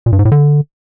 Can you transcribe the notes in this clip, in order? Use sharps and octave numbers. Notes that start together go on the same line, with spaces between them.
A#2
G2
G#2
A2
D3